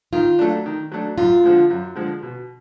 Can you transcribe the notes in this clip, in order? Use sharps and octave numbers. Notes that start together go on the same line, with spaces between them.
D#3 F4
F#3 A3 D4
D#3
F#3 A3 D4
F#2 F4
D3 F3 G#3
F#2
D3 F3 G#3
B2